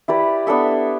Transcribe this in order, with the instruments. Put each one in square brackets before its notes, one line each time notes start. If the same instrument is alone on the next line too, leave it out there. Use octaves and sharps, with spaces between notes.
[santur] E4 G4 B4 D5
B3 D4 A4 E5